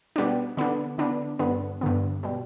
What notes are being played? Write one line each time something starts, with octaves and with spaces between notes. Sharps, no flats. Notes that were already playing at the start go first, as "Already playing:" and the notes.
B2 G3 B3 D4
D3 B3 D4
D3 B3 D4
G2 D3 B3
G2 D3 B3
B2 G3